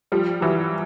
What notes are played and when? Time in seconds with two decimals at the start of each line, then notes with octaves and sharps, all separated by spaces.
0.12 F3 G3
0.41 E3 F#3